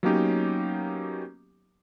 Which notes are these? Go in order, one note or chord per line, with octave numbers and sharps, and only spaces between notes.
F#3 A#3 B3 C#4 D#4 G4